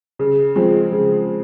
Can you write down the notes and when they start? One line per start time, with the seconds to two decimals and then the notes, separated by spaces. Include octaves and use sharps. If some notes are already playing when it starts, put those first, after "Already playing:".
0.19 C#3
0.56 F3 G#3 C4
0.92 C#3